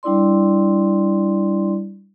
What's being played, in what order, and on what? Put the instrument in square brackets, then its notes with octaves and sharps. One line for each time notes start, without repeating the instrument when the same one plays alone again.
[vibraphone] G3 D4 E4 D5 C6